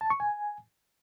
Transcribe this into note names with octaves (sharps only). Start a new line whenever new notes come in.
A5
C#6
G#5